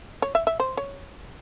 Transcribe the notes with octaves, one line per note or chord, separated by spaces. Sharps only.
C#5
E5
E5
C5
C#5